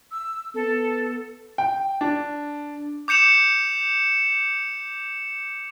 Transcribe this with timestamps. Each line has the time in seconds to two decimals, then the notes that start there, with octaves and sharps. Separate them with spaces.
0.11 E6
0.55 B3 A4
1.58 G5
2.01 D4
3.08 D6 G6 C#7 E7 F7